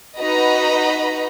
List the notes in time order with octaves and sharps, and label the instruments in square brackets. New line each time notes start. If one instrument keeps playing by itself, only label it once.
[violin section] D#4 F#4 B4 D#5 A#5 B5